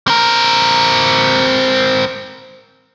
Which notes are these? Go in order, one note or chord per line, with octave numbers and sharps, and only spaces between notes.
C4 A#4